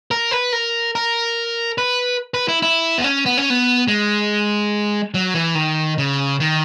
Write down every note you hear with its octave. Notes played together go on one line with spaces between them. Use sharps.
A#4
B4
A#4
A#4
B4
B4
E4
E4
B3
C#4
B3
C#4
B3
G#3
F#3
E3
D#3
C#3
D#3